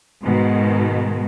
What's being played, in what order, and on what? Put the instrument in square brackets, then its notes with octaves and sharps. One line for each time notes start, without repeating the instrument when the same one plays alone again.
[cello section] G#2 B2 D#3 G#3